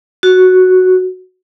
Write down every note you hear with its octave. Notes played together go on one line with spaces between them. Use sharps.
F#4